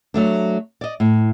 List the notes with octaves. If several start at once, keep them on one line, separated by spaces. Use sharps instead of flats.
F#3 A3 D4
D5 D#5
A2